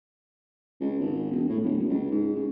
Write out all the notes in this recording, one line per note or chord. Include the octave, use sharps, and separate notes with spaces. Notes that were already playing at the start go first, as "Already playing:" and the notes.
C#2
G#1
E1
A2
D1
F#1
C#2
G#2
C#3